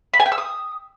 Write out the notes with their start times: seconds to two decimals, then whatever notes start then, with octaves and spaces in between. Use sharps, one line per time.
0.14 B5
0.20 G#5
0.26 G5
0.32 E6
0.38 D#6